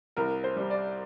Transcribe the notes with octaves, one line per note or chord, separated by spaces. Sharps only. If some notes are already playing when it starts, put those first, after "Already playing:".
C2 A#4
C5
G3
D5